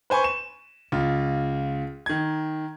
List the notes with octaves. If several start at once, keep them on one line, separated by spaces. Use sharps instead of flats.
B4 C5 G#5 B5 C#6
E7
C#2 F4
D#3 G#6